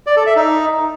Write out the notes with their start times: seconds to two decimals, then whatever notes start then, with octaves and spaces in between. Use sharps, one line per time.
0.06 D5
0.16 A4
0.26 E5
0.36 D#4